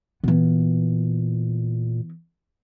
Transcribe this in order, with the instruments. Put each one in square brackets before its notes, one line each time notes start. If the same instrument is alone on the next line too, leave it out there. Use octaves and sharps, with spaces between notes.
[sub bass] A#2 [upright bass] E3 B3